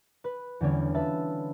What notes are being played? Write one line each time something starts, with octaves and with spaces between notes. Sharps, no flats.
B4
E2 D3 G3 C#4
F4 B4 E5 A5